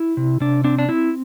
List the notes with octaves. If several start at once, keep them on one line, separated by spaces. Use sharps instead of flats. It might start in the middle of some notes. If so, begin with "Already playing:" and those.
Already playing: E4
C3
C3 D4
C4 D4
D4
C4 E4